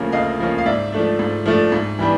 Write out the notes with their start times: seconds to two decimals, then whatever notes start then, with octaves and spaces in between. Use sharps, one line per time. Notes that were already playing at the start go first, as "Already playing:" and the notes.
Already playing: D2 C#3 F3 A#3 C#4
0.12 D2 D#5 F5
0.39 C#3 F3 A#3 C#4
0.58 F5
0.66 G#2 D5 E5
0.92 F3 A3 D4
1.19 G#2
1.46 F3 A3 D4
1.72 G#2
1.99 E3 G3 B3 D4